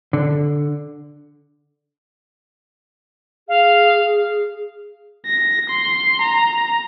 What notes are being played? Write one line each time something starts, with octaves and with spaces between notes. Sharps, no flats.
D3
G#4 F5
A#6
C6
A#5